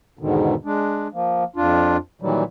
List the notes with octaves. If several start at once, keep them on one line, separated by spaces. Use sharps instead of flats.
E2 G#2 B2 D3 D#3
G#3 D4
F3 A#3
F2 D4 F4
A#2 D#3 E3 F#3 G3